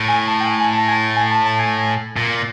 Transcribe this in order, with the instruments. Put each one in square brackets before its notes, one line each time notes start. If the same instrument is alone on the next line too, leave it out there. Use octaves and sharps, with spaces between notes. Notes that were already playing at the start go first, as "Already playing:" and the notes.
Already playing: [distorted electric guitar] A2
[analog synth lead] G#5
A5
G5
G#5
G#5
A5
G#5
G#5
A5
A5
G#5
[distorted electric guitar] A#2